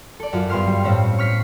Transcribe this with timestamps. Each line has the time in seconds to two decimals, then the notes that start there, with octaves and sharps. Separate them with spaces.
0.20 A4 D5
0.33 F#2 F4
0.49 G2 B3 C6 F6 C7
0.67 G3
0.85 A2 C4 C#4
1.18 C#6 F6 B6 C7